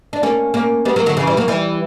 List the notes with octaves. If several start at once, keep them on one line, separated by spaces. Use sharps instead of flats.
D4
A#3 C#4
A#3 C#4
G3 B3
F#3 A#3
D3 F#3
C#3 E3
E3 G3
F#3 A#3
E3 G3